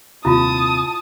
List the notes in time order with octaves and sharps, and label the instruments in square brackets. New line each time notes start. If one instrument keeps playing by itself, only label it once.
[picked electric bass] D#1 D#2 C3 [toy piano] E4 F4 [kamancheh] A5 D#6